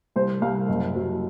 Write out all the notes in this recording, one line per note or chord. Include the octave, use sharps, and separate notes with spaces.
C2 C5
C2 F5
F#1
F#3